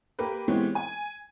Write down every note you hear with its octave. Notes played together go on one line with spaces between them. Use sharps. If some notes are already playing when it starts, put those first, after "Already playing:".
A#3 G4 A#4 B4
E3 G#3 B3 C4 G4 C#5
G#5